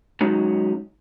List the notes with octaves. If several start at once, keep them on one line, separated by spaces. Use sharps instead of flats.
F#3 G#3 C#4 D#4 F#4